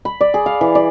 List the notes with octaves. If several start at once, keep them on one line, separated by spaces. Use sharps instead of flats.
B5
D5
G#4
F5
E3
D5